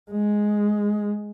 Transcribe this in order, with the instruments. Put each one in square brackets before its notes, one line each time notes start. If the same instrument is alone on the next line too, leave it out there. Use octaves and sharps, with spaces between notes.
[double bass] G#3